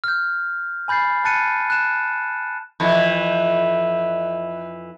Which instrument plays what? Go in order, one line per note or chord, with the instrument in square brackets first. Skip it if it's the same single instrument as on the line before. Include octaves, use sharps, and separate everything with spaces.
[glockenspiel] F6 G6
G#5 B5 G6 A6 C7
A5 F#6 A6 C#7 D#7
F#6 E7
[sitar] F2 E3